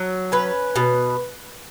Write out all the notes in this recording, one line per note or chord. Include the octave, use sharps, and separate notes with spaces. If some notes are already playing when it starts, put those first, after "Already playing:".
Already playing: F#3
C#4 B4
B2